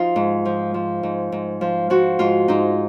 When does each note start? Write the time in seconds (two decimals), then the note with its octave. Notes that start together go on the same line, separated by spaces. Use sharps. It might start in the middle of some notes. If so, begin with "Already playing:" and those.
Already playing: F3 D#4 F4
0.16 G#2
0.45 F3
0.74 F3
1.03 G#2
1.32 G#2
1.61 F3
1.90 F3 F#4
2.19 G#2 F4
2.48 G#2 D#4